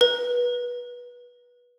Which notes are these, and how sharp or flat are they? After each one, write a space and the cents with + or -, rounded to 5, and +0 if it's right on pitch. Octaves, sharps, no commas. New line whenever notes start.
B4 -20